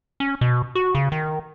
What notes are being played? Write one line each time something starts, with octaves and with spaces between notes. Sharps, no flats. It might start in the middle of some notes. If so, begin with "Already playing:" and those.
C#4
B2
F#4
C#3
D#3